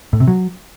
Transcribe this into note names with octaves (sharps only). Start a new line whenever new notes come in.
A2
C3
F#3